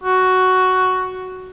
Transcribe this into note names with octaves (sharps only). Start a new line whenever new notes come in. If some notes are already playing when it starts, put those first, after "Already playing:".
F#4